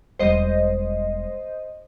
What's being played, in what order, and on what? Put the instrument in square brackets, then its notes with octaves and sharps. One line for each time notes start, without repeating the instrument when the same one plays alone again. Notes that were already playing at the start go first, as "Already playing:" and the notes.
[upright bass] E1 G3 [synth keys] C5 D#5